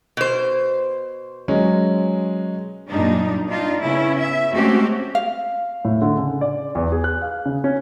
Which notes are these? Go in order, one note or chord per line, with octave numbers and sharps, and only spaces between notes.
B2 C5
F#3 G#3 C#4
F#2 A#2 G3 D4 D#4
D4 D#4 F4
C#3 B3 C#4 E4
E5
G#3 A3 C4 C#4 F#4 G4
F5
A2
D3
C#3
D5
E2
G#4
F#6
F5
C#3
C#4